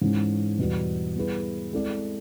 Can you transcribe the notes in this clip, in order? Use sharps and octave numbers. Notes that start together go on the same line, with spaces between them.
G#2 E3 G#3 C#4
E2 B2 G3
G3 B3 E4 G#4 B4
G#3 C4 E4 A4 D5